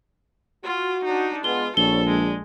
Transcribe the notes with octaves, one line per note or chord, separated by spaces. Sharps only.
F4 F#4
D4 D#4
G#3 B3 F4 G7
A#1 G3 C4 A4 C#5 G7
G#3 D4